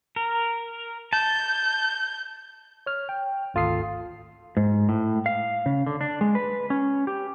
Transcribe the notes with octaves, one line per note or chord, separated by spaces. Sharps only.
A#4
A5 G6
C#5 F6
G5
G#1 D2 F4 A4 D#6 C7
G#2
A2
F5
C#3
D3
D4
G#3
B4
C#4
G4